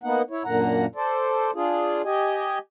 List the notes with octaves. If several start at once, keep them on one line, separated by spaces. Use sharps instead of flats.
A#3 B3 D#4 F#5
E4 C#5
F#2 A#2 D3 A#3 F#5 A#5
A4 C5 D5
D4 F4 G#4
G4 D#5 G#5